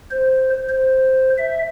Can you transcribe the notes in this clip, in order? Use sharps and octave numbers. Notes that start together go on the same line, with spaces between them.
C5
C5
E5